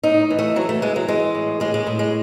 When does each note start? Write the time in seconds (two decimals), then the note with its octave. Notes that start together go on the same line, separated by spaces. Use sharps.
0.04 A2 D#4
0.30 E3
0.39 A3
0.56 E3 F#3
0.69 A3
0.82 E3 G#3
0.96 F#3
1.08 E3 G#3
1.35 A2
1.60 A2 G#3
1.74 G#3
1.87 A2
1.99 G#3